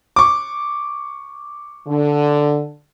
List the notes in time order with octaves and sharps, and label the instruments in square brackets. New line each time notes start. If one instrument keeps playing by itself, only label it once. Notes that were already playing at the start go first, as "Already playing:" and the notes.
[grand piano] C#6 D6
[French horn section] D3